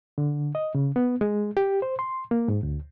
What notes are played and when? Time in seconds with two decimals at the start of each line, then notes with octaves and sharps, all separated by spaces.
0.18 D3
0.55 D#5
0.75 C#3
0.96 B3
1.21 G#3
1.57 G4
1.82 C5
1.99 C6
2.31 A#3
2.48 G#2
2.63 D2